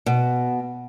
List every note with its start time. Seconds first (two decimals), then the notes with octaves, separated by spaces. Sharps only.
0.06 B2